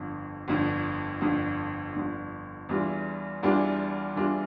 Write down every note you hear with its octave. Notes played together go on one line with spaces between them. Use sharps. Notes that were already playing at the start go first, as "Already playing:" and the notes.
Already playing: G1 F2 D3
G1 F2 D3
G1 F2 D3
G1 F2 D3
E2 E3 G3 D4 F4
E2 E3 G3 D4 F4
E2 E3 G3 D4 F4